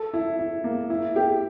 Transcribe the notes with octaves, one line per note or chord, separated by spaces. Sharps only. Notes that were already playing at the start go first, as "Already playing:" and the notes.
Already playing: A4
E4
E4
A#3
E4
G4